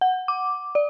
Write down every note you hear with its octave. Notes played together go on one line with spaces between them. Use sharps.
F#5
D6
D5